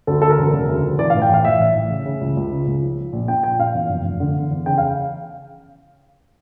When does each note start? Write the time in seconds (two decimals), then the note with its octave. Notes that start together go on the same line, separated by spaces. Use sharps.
0.07 D2 A4
0.22 D2 A4
0.30 A#4
0.38 E1
0.53 C#3
0.69 D2
0.83 F3
0.99 E3 D5
1.10 F5
1.14 A2
1.22 G5
1.29 A1 F5
1.45 A2 E5
1.60 A1
1.75 A1
1.91 C#3
2.06 C#3
2.21 C#2
2.37 C#2
2.52 C#3
2.67 C#2
2.82 F3
2.98 F3
3.13 A#1
3.28 A#2 G5
3.44 A#1 G5
3.59 A#2 F5
3.75 E2
3.89 F1
4.05 F1
4.20 D3
4.36 E2
4.51 E2
4.66 C#3 G5
4.78 F5